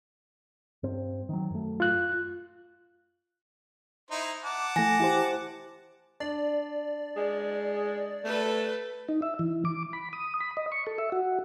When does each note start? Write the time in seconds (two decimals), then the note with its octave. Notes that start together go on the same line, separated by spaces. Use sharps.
0.83 G2 C4
1.29 D#3 F#3
1.50 F#2 A3
1.80 F4 F#6
4.11 D#4 E4 C5
4.43 F#5 A5 D6
4.76 E3 A3 G#5 A#6
5.00 E4 G4 C5
6.20 D4 D5
7.16 G#3
8.24 A3 A4 B4
9.09 D#4
9.22 E5
9.39 E3
9.65 D6
9.93 B5
10.13 D#6
10.41 B5
10.57 D#5
10.72 C#6
10.87 A4
10.98 E5
11.12 F#4